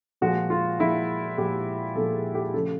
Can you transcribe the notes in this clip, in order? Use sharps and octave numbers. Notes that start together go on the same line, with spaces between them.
A#2 F3 G#3 F#4
F4
A#2 F3 G#3 E4
A#2 F3 G#3 G4
A#2 F3 G#3 A4
G#4
G4
C#3 F3 A3 A4